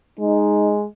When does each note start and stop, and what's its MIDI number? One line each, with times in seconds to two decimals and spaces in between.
0.19 0.84 56
0.19 0.74 63